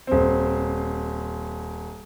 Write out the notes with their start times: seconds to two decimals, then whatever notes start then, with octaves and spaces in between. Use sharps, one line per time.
0.07 D#1 C4